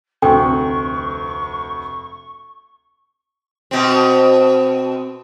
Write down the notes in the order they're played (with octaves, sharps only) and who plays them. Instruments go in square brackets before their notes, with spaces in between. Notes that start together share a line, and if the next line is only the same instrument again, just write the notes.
[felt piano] F1 D2 [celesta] A4 [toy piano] G5 [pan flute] C#6
[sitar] B2 C4